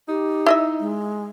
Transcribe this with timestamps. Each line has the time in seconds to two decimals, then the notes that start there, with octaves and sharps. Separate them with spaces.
0.09 D#4 G4
0.46 E4 D#5 E5
0.80 G#3